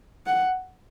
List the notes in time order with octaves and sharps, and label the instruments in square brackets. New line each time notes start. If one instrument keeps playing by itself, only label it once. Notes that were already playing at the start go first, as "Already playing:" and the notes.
[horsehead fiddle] F#5